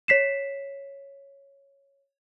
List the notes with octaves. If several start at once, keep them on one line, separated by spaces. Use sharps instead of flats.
C#5 B6 C7 E7